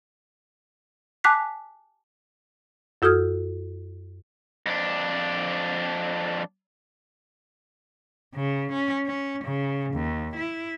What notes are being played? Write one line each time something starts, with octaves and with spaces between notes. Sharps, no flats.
G#5 A5 D6 F#6 B6 C7
F#2 F#4 A4 D#6 F6 G#6
F2 D4
C#3
C#4
C#4
C#3
D#2
E4